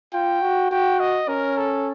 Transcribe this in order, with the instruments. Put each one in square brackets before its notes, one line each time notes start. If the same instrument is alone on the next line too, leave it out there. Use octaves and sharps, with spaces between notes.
[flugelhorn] F4 [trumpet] G5
[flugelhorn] F#4
[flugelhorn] F#4 [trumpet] G5
[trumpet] D#5
[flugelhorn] C#4 [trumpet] A#4
[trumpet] A4